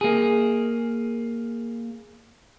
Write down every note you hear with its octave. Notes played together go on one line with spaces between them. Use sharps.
A#3 G#4